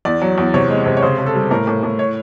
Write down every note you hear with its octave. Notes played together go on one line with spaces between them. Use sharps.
E2 D5
F#3
E2
C3 C#5
G#3
C3
C#5
C#3 C5
C#3
A4
G3
A2 A#4
A2
A2
C#5